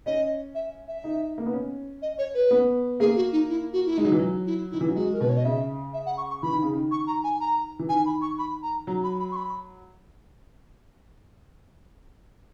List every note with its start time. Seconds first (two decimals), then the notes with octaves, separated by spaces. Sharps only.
0.06 C#4 D#5
0.55 E5
0.88 E5
1.04 D#4
1.38 A#3
1.46 B3
1.53 C#4
2.02 D#5
2.18 C#5
2.34 B4
2.51 B3
3.00 A#3 G#4
3.16 F#4
3.32 D#4
3.49 E4
3.73 F#4
3.86 E4
3.97 G#3 D#4
4.05 F#3
4.12 E3
4.19 F#3
4.46 E4
4.71 D#3 E4
4.81 E3
4.88 F#3
4.95 G#3 F#4
5.14 A#4
5.20 B2 B4
5.29 C#5
5.36 D#5
5.44 C#3 E5
5.94 E5
6.06 F#5
6.17 C#6
6.30 C#6
6.42 E3 B5
6.52 D#3
6.63 C#3
6.73 D#3
6.91 C#6
7.07 A#5
7.24 G#5
7.40 A#5
7.79 E3
7.89 D#3 G#5
8.06 B5
8.22 C#6
8.38 B5
8.63 A#5
8.87 F#3 A#5
9.04 B5
9.20 B5
9.32 C#6
9.36 B5